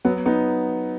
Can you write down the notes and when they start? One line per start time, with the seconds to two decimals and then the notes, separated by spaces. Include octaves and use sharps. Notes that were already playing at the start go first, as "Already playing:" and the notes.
0.05 F#3 B3
0.26 B3 D#4